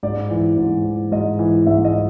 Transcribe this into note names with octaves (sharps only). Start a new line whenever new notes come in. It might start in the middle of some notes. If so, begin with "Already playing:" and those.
G#2 D5
E3
G#2
E3
G#2 D#5
E3
G#2 E5
D#5
E3